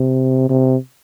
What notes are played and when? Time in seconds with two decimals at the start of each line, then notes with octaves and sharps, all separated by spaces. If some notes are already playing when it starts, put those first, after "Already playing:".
Already playing: C3
0.50 C3